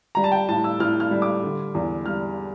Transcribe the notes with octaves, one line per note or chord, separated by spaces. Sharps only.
G3 A#5
A5
G5
A2 A5
E6
A2 F6
F6
G3
D6
D3
E2
G3 F6